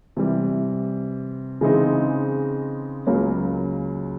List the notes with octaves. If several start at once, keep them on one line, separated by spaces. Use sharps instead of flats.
C3 E3 G3
C#3 E3 G#3 C4 D#4
C#2 C#3 F#3 A#3 C#4